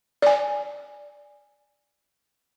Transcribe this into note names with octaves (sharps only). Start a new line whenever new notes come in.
D5 G#5